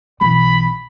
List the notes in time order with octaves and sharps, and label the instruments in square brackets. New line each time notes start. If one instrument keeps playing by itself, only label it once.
[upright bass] B1 E3 [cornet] B5